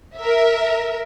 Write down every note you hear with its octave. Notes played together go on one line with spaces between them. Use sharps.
A#4 E5